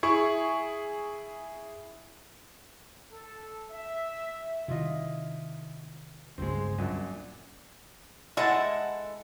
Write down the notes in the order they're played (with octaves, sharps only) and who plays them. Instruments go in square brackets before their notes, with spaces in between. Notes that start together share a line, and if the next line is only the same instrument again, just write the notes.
[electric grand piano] E4 G#4 C#6
[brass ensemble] A4
E5
[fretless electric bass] C3 D#3 [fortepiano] E4 F4 D#5
[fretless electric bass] G1 C#2 [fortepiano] G#3 C4
[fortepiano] F#2 A#2 D4
[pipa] G#3 E4 [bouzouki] A4 F#5 A5